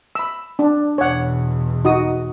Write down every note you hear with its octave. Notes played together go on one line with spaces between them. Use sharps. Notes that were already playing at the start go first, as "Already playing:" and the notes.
B5 E6
D4
E2 B2 C#5 F#5
D#4 F#4 D#6